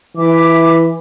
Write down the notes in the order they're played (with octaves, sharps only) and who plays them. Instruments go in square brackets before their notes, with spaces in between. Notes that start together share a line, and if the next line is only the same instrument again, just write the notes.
[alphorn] E3 [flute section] E4 E5 D6